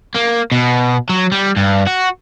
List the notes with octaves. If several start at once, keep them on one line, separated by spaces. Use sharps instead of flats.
A#3
B2
F#3
G3
G2
F#4